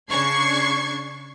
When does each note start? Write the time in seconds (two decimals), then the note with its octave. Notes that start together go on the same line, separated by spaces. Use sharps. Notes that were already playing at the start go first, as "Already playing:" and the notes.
0.10 C#3 D4 C#6 G#6 C7